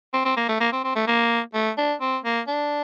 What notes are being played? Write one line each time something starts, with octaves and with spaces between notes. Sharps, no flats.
C4
C4
A#3
A3
A#3
C4
C4
A3
A#3
A3
D4
C4
A#3
D4